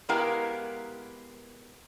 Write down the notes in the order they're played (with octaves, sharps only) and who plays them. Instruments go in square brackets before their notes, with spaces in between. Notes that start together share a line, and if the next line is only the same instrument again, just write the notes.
[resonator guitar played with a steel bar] G#3 B3 E4 G4 A#4 F5